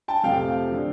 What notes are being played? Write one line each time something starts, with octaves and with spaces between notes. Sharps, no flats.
G5 A5
F2 C3 F3 A3 C4 F5 G5
D3 F3